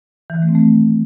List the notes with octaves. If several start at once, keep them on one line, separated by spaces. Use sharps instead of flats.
E3
D#3
A3
C4
A3